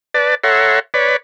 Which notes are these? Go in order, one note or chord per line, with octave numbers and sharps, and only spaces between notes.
B4 D5 A5
A4 C#5 E5 F#5 A#5 C6
B4 C#5 D5 B5